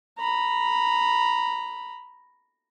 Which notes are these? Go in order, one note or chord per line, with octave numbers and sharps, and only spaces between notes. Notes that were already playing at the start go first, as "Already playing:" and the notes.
A#5 B5